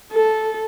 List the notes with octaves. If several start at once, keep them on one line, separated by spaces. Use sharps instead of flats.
A4